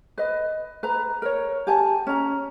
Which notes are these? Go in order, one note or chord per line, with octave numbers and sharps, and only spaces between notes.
B4 D#5
B4 A#5
A#4 C#5
G4 G#5 A5
C#4 A#5